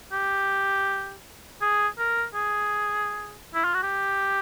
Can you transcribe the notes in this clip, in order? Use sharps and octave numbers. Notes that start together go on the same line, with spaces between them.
G4
G#4
A#4
G#4
E4
F4
F#4
G4